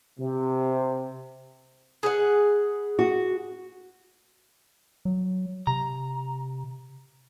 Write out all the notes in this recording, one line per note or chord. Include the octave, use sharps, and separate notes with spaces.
C3
G#4 B4 F#5
F#4
F#3
C3 A#5